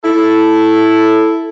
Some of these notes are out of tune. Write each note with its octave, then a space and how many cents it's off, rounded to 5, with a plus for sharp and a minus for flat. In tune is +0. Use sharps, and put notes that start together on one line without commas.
E4 +0 A4 -5